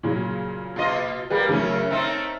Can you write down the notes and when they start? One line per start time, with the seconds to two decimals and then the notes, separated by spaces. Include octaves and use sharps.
0.03 A#2 C#3 F#3
0.76 B2 F4 D#5
1.30 G3 A#3 G#4 B4
1.49 F#2 C#3 F#3 A3 C#4
1.90 A3 C4 D#4 F6